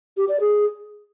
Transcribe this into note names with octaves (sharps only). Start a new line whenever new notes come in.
G4
D5
G#4